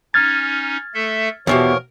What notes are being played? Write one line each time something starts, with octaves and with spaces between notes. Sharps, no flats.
C#4 D#4 F6 G#6 A6
A3 A4 E5
E2 B2 E3 F3 G4 A#4 C#5